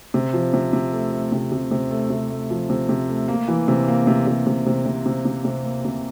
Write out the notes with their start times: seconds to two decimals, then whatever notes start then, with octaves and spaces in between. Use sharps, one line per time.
0.14 C3
0.33 F3
0.54 C3
0.73 C3
0.92 A3
1.12 A3
1.32 C3
1.52 C3
1.71 C3
1.91 A3
2.10 C3
2.30 A3
2.50 F3
2.70 C3
2.89 C3
3.09 A3
3.28 A#3
3.48 E3
3.68 C3
3.88 A#3
4.07 C3
4.27 C3
4.47 C3
4.66 C3
4.86 C3
5.06 C3
5.25 C3
5.45 C3
5.64 A#3
5.85 C3